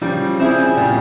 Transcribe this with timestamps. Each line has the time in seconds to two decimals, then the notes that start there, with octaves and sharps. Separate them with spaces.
0.02 C#3 F3 G3
0.40 C4 E4 G#4
0.77 A#2 C#3 G3